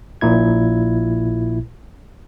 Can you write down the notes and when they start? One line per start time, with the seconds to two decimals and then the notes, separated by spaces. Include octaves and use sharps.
0.21 A#1 A#2 E4 G#6